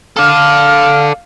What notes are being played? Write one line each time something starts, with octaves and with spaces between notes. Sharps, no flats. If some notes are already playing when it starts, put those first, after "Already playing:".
A4 D5 F5 F6